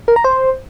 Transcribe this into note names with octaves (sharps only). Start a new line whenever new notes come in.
A#4
A#5
C5